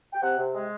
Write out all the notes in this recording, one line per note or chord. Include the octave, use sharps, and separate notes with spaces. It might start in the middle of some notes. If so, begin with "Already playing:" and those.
G5
C3 F#5
C3
G#3